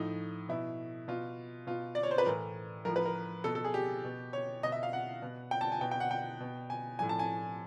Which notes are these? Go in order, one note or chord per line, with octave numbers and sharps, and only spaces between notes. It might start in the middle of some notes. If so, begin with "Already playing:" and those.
Already playing: A2 F3 D#4
B2 E4
B2 F4
B2 F4
D5
C#5
C5
B4
A2 E3 A#4
A2 F3 A#4
B4
A#4
B2 A4
A4
G#4
G4
B2
C#5
B2 D#5
E5
F5
F#5
B2
G5
A5
G#5
B2 G5
G5
F#5
G5
B2
G#5
A2 F3 G#5
A5
G#5